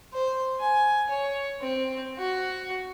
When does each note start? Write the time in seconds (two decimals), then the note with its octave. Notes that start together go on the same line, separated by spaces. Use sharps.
0.13 C5
0.60 G#5
1.10 C#5
1.61 C4
2.18 F#4